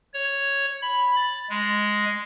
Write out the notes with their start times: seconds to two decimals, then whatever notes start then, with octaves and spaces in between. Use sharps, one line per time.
0.14 C#5
0.82 B5
1.16 A6
1.50 G#3